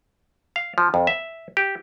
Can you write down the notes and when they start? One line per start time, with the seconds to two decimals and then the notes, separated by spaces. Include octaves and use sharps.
0.56 F5
0.78 F3
0.94 F2
1.07 E5
1.57 G4